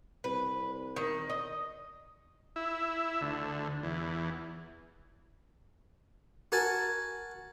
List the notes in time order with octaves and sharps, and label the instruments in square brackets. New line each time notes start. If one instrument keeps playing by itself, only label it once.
[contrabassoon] C2 [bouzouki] B4
[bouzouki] D#3
D#5
[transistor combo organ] E4
D2
E2
[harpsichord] F#4 A#4 G#5 A5